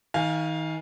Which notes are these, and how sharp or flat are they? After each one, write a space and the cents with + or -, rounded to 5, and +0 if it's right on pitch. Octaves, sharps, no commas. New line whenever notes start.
D#3 +35 F5 +0 G#5 +0